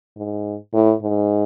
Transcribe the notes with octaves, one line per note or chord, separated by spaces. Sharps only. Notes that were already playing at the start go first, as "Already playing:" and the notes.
G#2
A2
G#2